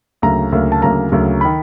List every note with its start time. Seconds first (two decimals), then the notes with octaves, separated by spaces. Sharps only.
0.22 D2 C#3 F#3 A#3 A#5
0.52 D2 C#3 F#3 A#3
0.72 A5
0.82 D2 C#3 F#3 A#3 A#5
1.12 D2 C#3 F#3 A#3
1.41 D#3 B5